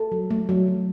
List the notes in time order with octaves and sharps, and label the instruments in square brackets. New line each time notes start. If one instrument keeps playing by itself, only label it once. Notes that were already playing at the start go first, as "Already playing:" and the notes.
Already playing: [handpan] A4
F#3
A3
F#3
F#3